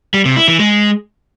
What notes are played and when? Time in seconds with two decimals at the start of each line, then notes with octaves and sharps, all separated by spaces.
0.14 G3
0.25 C3
0.37 E4
0.48 E3
0.59 G#3